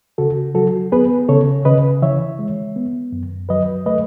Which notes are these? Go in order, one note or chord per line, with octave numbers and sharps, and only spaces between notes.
C#3 F#4 A4
F#3 F#4 A4
B3 G#4 B4
C#3 A4 C#5
C#3 B4 D#5
E3 C#5 E5
G#3
B3
F#2
F#3 B4 D#5
A3 B4 D#5